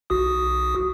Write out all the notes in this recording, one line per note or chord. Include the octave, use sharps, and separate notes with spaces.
B1 F#4 D#6